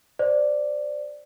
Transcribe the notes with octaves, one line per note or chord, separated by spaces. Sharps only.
C5 D5